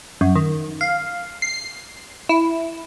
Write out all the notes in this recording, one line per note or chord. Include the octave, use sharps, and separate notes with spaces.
F#2
D#3
F5
C7
E4